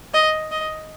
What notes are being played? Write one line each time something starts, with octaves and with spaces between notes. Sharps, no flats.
D#5
D#5